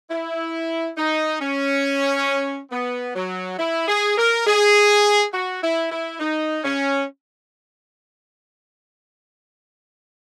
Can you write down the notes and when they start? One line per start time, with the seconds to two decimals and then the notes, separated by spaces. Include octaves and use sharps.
0.10 E4
0.97 D#4
1.40 C#4
2.71 B3
3.15 F#3
3.59 E4
3.88 G#4
4.17 A#4
4.46 G#4
5.33 F#4
5.62 E4
5.91 E4
6.19 D#4
6.64 C#4